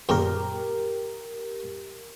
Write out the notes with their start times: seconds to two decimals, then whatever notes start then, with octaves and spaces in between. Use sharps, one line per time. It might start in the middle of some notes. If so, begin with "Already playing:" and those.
0.09 F#2 A#2 C#3 G4 A#4